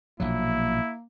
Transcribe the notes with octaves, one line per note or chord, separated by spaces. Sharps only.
A#1 B2 F#3 A#3 E4